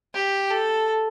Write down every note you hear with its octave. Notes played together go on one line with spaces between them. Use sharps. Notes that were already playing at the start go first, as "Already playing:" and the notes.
G4
A4